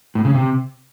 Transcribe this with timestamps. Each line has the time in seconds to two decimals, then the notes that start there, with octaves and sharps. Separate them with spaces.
0.15 A2
0.25 C#3
0.34 C3